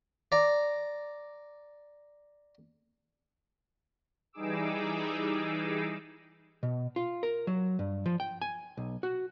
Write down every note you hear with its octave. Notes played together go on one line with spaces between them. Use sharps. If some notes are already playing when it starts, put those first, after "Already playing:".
D5 A#5
E3 G3 D#4 G#4 D6 E6
B2
F4
A#4
F#3
G2
F3
G5
G#5
B1
F#4